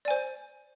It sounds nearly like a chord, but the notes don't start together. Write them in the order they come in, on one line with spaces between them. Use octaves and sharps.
D5 G#5 C5